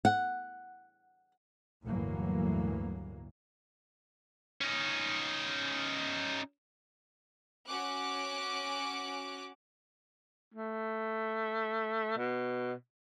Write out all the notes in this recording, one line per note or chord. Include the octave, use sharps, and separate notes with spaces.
F#5
G1 D2 A2 E3 F#3 A#3
C#4 D#4
C#4 F#4 D6 F#6
A3
B2